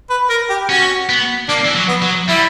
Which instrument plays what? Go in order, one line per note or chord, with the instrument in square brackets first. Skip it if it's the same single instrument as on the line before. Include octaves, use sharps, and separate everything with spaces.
[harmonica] B4
A#4
G4
[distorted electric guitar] C#4 [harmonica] F#4
[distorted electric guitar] B3
[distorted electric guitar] A#3 [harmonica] D4
[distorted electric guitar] E3
F#3
[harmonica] B3
[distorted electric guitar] F#3
[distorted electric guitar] G3 [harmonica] E4